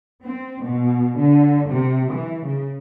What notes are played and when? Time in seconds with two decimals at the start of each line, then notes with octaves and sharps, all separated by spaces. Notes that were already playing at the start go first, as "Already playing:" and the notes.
0.22 C4
0.64 B2
1.18 D3
1.70 C3
2.13 E3
2.46 C#3